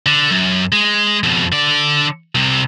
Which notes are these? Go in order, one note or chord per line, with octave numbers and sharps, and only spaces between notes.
D3
F#2
G#3
F2 B2
D3 D5
C2 C3